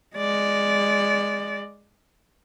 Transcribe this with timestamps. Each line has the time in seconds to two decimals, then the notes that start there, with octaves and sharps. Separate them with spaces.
0.17 G#3 D5